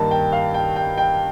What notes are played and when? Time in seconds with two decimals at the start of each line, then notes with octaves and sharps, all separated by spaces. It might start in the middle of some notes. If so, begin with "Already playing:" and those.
Already playing: G2 D#3 A#3 A5
0.11 G5
0.32 F5
0.54 G5
0.76 G5
0.98 G5